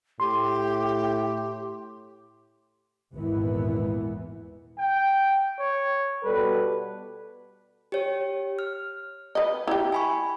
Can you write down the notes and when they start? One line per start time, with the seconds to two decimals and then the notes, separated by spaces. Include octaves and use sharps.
0.20 A2 G4 C6
3.13 G#1 E2 A#2 E3 B3
4.78 G5
5.59 C#5
6.23 B2 G3 A4 B4
7.92 G4 C#5
8.59 F6
9.35 B4 D#5
9.67 E4 G4
9.92 G#5 B5 C#6